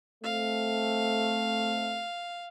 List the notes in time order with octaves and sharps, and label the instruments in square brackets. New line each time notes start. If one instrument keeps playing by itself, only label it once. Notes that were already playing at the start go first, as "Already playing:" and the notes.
[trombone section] A3 C4 [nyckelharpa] F5